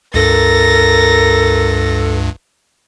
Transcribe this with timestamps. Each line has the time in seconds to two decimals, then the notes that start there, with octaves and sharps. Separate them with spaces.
0.14 C#2 G2 A4 A#4 A6 A#6